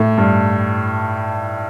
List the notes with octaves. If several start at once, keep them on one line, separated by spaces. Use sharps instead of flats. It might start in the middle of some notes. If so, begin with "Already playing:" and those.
Already playing: A2
G2